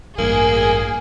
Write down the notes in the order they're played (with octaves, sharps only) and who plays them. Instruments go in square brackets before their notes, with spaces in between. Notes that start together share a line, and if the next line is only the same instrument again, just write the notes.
[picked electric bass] A1 G2 [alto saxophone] A#3 [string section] G#4